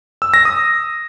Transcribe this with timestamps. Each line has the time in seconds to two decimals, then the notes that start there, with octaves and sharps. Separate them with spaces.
0.22 E6
0.34 A#6
0.45 D#6